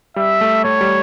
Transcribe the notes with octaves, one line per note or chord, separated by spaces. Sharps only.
G3 E5
A3
A3 C#5
G3